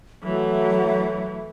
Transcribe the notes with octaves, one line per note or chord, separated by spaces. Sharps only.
E3 F#3 A3